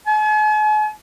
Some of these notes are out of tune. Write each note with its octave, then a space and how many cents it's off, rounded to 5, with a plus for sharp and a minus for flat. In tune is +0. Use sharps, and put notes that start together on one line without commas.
G#5 +45